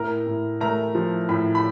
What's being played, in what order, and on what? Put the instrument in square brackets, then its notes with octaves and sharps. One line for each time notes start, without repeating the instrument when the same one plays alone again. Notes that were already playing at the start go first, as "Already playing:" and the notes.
Already playing: [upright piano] A2 A#4 A#5
A2
A3 A#4 A#5
F3
A2 B5
B5